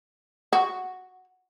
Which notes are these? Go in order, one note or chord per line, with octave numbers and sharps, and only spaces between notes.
F#4